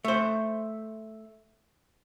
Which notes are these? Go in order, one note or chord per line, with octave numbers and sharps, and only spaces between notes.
A3 C5